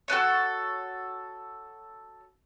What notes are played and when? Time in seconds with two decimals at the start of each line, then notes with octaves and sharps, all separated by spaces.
0.08 F#4 A4 B4 C#5